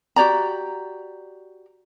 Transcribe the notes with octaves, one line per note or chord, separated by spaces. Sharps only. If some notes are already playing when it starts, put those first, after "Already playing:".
F#4 G4 D5 A#5